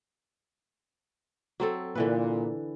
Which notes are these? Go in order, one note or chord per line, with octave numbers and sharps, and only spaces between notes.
F#3 C4 A4
A#2 D3 E3 B4